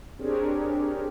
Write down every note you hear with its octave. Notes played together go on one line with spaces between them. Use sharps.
C4 D4 G4 G#4 A#4 C#5